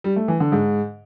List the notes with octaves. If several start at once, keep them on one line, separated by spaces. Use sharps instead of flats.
G3
A3
E3
D3
G#2